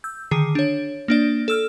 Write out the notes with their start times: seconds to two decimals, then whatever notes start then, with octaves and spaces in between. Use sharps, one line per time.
0.04 E6 G6
0.31 D3 D#3 G#4 C7
0.55 D4 C#5
1.08 A#3 D4 D5
1.48 A4 E6 F6